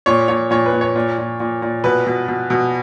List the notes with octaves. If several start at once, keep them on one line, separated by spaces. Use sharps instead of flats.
A#2 C#5
A#2 C#5
A#2 C#5
B4
A#2
C#5
A#2
A#2
A#2
A#2
B2 B4
B2
B2
B2